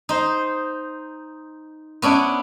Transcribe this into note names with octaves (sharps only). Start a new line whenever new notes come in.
D#4 C5
B3 C#4 D4 E4